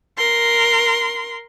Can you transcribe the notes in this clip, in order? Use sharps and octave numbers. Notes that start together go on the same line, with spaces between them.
A#4 C6